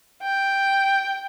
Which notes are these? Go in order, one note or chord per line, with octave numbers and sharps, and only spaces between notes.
G5